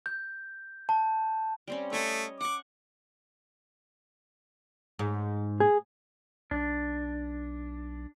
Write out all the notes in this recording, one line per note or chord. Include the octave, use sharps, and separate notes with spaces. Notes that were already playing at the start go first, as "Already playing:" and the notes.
G6
A5
G3 C4 C#4
A3 C#5 D#5
F#5 C#6 D6
G#2
G#4
B1 D4